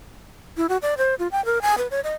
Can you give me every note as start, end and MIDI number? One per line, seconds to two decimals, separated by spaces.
0.57 0.67 64
0.69 0.77 66
0.82 0.94 74
0.98 1.15 72
1.19 1.28 65
1.32 1.44 79
1.45 1.61 70
1.62 1.78 80
1.78 1.87 71
1.91 2.00 73
2.04 2.14 75